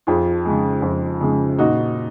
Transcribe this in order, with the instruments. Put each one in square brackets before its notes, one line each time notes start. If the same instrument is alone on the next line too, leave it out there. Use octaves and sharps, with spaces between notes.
[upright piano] F2 F4 G#4
C#3 G#3
F2
C#3 G#3
A#2 D#4 F#4